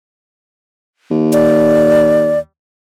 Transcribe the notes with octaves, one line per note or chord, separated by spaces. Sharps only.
D#2
D5